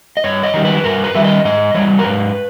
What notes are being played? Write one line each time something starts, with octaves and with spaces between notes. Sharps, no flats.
D#5
G2 C#5
D#5
D#3 G3
B4
G2 A#4
B4
D#3 G3 E5
D#5
G#2 D#5
E3 G3 C#5
A#4
G#2 B4